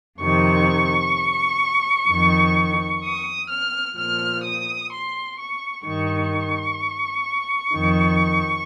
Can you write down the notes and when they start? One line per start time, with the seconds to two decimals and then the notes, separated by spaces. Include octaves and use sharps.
0.20 F2 C3 D#3 C#6
2.08 F2 D#3
3.04 D#6
3.50 F6
3.97 A#2 F3 F6
4.44 D#6
4.91 C6
5.39 C#6
5.85 G2 D#3 C#6
7.74 F2 D#3